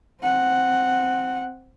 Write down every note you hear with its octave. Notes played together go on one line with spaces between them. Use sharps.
C4 F#5